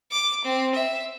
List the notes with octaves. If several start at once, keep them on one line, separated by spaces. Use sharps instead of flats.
D6
C4
E5